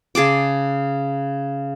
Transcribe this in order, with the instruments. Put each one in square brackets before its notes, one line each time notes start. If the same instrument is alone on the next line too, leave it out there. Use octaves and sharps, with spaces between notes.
[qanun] C#3 G#4 A5 D6